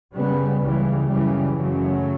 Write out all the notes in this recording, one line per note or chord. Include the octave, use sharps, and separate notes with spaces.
F#2 C#3 G3 B3
C#2 C#3 E3 G3
F#2 C#3 E3 G3
F#2 C#3 F#3 A3